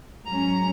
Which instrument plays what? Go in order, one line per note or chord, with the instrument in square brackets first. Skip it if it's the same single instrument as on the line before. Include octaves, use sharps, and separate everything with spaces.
[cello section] G#2 F#3 C#4 [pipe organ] A#5